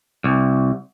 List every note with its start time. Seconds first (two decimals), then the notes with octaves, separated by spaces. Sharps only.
0.24 C2